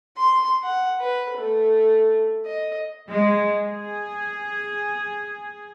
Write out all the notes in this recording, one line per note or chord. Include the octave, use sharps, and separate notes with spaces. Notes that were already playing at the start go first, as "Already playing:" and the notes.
C6
F#5
B4
A3
D#5
G#3
G#4